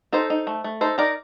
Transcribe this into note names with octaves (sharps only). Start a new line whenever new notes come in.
D#4 A4 C5
D#4
A3
A3
D#4 A4 C5
D#4 A#4 D5